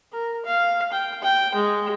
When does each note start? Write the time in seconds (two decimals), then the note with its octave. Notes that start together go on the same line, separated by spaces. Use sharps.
0.12 A#4
0.46 F5
0.92 G5
1.22 G5
1.55 G#3